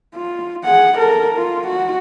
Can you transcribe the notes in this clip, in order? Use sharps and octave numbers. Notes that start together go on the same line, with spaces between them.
F4
G#4 F#5
A4 A#4
F4
F#4